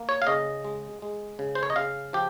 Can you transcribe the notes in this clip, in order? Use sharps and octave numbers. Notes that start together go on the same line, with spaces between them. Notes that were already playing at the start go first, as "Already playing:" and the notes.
Already playing: A#3
C#5
F5
C#3 D#5
G#3
G#3
C#3
C5
C#5
D#5
C#3 F5
F3 G4